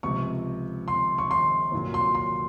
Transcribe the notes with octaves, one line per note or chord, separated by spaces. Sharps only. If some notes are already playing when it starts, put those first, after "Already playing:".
C#2 C3 F3 C#6
C6
C#6
C6
C2 A#2 F#3
C6
C6